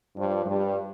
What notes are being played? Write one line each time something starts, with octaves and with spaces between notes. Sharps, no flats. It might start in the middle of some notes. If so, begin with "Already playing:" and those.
G2 F3
G2 G3